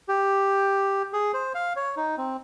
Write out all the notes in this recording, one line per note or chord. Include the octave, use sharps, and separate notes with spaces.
G4
G#4
C5
F5
C#5
D#4
C4